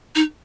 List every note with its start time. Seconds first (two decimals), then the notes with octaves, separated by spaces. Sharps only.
0.15 D#4